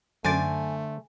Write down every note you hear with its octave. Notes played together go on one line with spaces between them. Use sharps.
F#2 D3 A3 C5 G#5 D6 A6